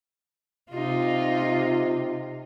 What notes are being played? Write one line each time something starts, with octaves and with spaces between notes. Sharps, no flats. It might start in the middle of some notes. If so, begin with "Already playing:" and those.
C3 D#4 F4